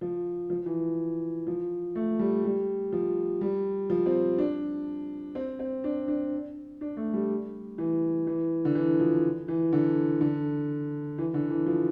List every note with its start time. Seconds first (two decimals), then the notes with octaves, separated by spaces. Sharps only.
0.01 F3
0.50 F3
0.66 E3
1.47 F3
1.95 A3
2.19 G3
2.45 G3
2.92 F3
3.41 G3
3.90 F3
4.06 C4
4.38 D4
5.35 C4
5.59 C4
5.84 D4
6.08 D4
6.81 D4
6.97 A3
7.13 G3
7.78 E3
8.27 E3
8.65 D3
8.75 E3
9.00 F3
9.48 E3
9.73 D3
10.21 D3
11.18 E3
11.34 D3
11.50 E3
11.66 F3